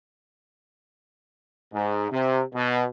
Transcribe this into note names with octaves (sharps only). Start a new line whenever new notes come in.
G#2
C3
B2